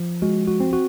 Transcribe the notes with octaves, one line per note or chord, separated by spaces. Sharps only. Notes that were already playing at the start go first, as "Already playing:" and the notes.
Already playing: F3
G#3 F#4
F#4
C4
F#4